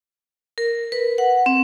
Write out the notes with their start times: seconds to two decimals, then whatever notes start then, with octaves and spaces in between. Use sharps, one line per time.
0.58 A#4
0.92 B4
1.18 F#5
1.46 C4